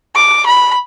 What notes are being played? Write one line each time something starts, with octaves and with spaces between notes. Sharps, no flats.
D6
B5